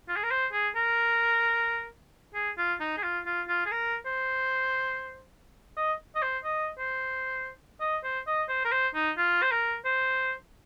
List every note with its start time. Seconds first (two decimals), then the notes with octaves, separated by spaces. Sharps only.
0.09 F4
0.16 G#4
0.24 A#4
0.31 C5
0.53 G#4
0.76 A#4
2.34 G#4
2.58 F4
2.80 D#4
2.97 G#4
3.03 F4
3.26 F4
3.49 F4
3.66 G#4
3.71 A#4
4.06 C5
5.77 D#5
6.16 D#5
6.22 C5
6.44 D#5
6.78 C5
7.81 D#5
8.04 C5
8.27 D#5
8.49 C5
8.65 A#4
8.72 C5
8.95 D#4
9.17 F4
9.42 C5
9.51 A#4
9.85 C5